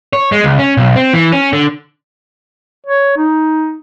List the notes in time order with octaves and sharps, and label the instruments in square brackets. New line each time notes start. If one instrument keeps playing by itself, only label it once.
[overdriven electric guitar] C#5
G#3
C#2
C#4
B1
C4
E3
C#4
D3
[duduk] C#5
D#4